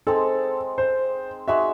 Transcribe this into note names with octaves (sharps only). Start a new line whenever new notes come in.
G#3 C4 D#4 A4
C5
G#3 D#4 F#4 E5